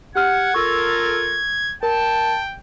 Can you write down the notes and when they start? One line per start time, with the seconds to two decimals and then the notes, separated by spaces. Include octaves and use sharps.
0.15 G4 F#5 F6 G#6
0.54 F4 A4 A#4 C#6 E6
1.83 A#4 G5 A5